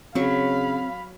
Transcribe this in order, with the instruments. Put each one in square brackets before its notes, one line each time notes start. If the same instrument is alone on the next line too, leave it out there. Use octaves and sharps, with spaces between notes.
[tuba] C#3 [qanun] F#3 C#6 [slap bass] C4 [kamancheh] F5 B5